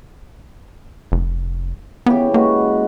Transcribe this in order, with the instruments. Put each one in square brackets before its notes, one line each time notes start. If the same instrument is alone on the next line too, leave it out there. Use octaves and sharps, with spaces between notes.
[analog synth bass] F1
[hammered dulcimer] C#3 E3 G4 [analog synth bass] B3
[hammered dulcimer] G#3 F#4 B4 [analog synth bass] A#3